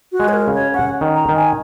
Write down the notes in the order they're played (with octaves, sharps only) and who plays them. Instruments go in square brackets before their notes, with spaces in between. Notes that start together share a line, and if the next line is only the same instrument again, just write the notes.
[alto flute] F#4
[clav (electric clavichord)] G#3
[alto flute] C#5
A#4
[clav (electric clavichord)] C#3
[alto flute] C#5
[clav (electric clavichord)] C#4 [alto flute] F#5
[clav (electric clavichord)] D#3
[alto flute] A#5
[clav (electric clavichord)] D#3
[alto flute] G#5